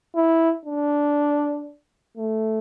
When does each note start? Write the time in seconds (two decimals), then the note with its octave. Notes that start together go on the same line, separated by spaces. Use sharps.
0.15 E4
0.65 D4
2.17 A3